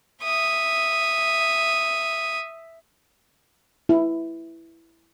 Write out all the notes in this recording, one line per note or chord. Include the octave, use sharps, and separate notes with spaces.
E5 D#6
E4